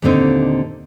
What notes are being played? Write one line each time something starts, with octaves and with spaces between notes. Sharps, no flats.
D#2 A#2 D3 C4 D#4